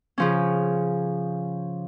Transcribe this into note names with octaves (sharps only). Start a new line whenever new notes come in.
C#3 F3 C#4